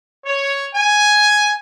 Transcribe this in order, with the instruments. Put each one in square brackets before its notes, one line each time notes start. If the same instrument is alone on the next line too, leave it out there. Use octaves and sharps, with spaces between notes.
[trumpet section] C#5
G#5